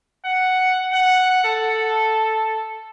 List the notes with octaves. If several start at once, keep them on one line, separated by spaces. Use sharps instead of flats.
F#5
F#5
A4